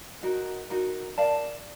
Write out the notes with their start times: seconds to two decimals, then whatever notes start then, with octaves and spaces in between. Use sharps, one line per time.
0.22 D#4 F#4 A#4
0.70 D#4 F#4 A#4
1.18 A#4 D5 F5 A5